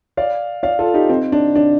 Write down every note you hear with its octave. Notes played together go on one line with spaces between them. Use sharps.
D5 F5
D5 F5
F4 A4
D#4 G4
C4 D#4
D4
D4